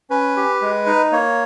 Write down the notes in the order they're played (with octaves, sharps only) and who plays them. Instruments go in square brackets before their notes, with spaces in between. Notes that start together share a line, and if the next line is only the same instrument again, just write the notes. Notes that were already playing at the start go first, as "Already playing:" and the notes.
[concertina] C#4 B4
G4
G#3
D#4
A#3 C#5